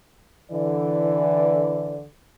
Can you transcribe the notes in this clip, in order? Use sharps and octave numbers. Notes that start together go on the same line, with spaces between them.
D3 E3 D5